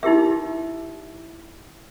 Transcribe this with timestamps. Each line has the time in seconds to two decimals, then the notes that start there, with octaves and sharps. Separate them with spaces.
0.03 D#4 E4 G4 A#4 E5